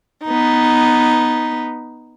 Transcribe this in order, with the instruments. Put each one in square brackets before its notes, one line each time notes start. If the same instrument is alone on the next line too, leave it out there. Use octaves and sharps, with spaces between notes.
[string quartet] B3 D#4